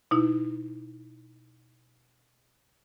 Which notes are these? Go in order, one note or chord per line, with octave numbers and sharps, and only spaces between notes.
B2 D#4 E4